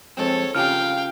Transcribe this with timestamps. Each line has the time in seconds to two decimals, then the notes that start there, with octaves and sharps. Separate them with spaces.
0.17 F2 G#3 C4 A4 C#5
0.55 C#3 F4 G4 F5 G5 F6